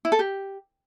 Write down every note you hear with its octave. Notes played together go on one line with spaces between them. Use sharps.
E4
A4
G4